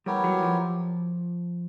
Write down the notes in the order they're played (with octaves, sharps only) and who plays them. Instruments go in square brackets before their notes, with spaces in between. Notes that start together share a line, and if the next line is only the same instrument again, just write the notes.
[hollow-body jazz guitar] G3 [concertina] B3 E4 G4 A#4 C#5
[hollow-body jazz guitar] F#3
F3